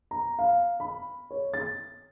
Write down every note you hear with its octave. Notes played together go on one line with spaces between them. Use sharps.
A#5
F5
B5
C#5
A6